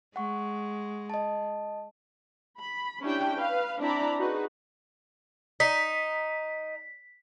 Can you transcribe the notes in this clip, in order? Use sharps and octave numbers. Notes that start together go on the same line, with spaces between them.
G#3 F#5 C#6
D#5 A5
B5
C#4 D4 E4 G4 G5
B4 F5
C4 D4 E4 D5 A#5 B5
D#4 F#4 G#4 B4
D#4 B6